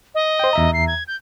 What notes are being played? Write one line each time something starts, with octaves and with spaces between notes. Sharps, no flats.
D#5
C5 G5
E2 E5 A#5
C7
G#6
G6